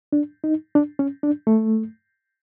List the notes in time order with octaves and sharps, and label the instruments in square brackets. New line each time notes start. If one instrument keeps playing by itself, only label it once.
[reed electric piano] D4
D#4
D4
C#4
D4
A3